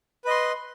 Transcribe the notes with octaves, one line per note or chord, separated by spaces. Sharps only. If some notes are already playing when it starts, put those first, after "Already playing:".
B4 D#5 C6